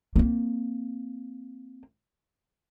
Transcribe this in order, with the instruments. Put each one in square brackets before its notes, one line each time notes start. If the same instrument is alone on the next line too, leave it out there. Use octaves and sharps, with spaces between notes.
[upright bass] A#3 C4